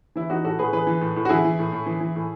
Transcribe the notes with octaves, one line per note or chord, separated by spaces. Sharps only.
E3 E4
E3 D#4 F#4
A2 F#4 A4
A2 G#4 B4
E3 G#4 B4
E3
A2
A2
F#4
E3 E4 G#4
E3
A2
A2
E3
E3
A2